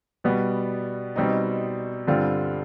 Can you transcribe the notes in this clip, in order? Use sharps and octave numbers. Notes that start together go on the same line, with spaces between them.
B2 G3 B3
B2 G3 C4 D#4
G2 D3 G3 C4 F4